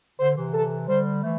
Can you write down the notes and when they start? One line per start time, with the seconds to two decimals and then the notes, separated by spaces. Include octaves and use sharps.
0.19 D3 C5
0.36 C3 E3
0.54 A4
0.88 D3 G3 C5
1.23 E3 A3